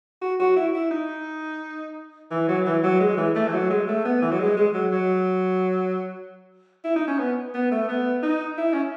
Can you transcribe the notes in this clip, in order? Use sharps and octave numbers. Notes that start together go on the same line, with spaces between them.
F#4
F#4
E4
E4
D#4
E3
F#3
E3
F#3
G#3
E3
A3
E3
F#3
G#3
A3
B3
E3
F#3
G#3
G#3
F#3
F#3
E4
D#4
C#4
B3
B3
A3
B3
D#4
E4
C#4